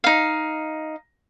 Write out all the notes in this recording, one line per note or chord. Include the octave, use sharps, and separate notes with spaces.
D#4 F5